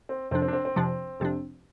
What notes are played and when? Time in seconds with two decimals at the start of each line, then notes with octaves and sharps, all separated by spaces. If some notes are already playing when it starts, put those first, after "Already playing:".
0.09 C4
0.31 F2 C3 F3 C4 D4
0.42 C4
0.48 D4
0.53 C4
0.65 C4
0.76 F2 C3 F3 D4
1.20 F2 C3 F3 D4